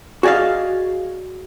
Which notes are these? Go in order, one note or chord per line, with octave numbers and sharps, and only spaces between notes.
F#4 G#4 D5 D#5 F5